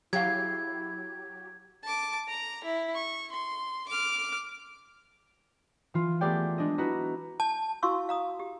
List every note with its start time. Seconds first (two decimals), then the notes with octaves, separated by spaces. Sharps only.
0.13 F#3 E4 G4 G#4 F5 G#6
1.84 A5 D6
2.28 A#5
2.64 E4
2.94 C#6
3.32 C6
3.88 D6 F6
5.94 E3 F4
6.21 A3 B3 G4 G#4 D5 G5
6.58 G#3 D4 D#5
6.78 E4 F#4 B4 D#5 A#5
7.40 A5
7.83 E4 F#4 F5 C6 C#6 E6
8.09 F5 A#5 D#6
8.39 G4